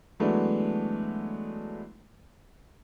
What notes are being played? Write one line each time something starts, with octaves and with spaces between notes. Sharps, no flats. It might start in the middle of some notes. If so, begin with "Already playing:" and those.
E3 F#3 G#3 A3 B3 D4